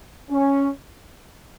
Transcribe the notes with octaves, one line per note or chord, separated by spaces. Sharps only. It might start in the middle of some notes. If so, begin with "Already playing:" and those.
C#4